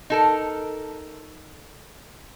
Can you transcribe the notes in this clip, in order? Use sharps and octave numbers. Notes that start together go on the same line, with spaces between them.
D#4 A4 A#4